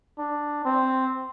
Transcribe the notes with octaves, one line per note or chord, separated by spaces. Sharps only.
D4
C4